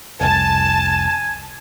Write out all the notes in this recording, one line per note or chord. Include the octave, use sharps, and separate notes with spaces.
F1 C2 G#5 A5